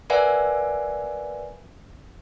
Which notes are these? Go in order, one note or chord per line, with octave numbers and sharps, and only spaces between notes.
A#4 B4 D5 E5 F#5 G#5